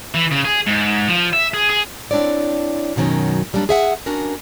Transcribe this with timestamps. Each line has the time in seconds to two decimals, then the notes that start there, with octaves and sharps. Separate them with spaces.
0.15 E3
0.32 C#3
0.45 G#4
0.67 G#2
1.08 F3
1.33 E5
1.54 G#4
1.70 G#4
2.11 C4 D4 E4 C#5 D5
2.96 F#2 B2 D#3 F#3 C#4
3.53 F#3 G3 A#3 C#4 D4
3.69 G#4 E5 F#5
4.06 C#4 D4 F#4 A#4